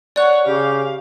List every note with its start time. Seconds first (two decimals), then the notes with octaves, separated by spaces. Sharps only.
0.16 C#5 D5 F#5 F#6
0.45 C#3 G4 F5